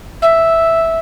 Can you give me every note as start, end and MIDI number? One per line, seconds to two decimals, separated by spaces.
0.21 0.98 76